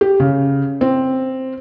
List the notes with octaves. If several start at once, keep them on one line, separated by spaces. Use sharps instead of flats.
G4
C#3
C4